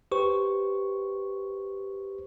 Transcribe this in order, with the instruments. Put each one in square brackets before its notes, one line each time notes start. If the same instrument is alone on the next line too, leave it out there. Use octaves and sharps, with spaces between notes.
[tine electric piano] G4 B4 C5 C#6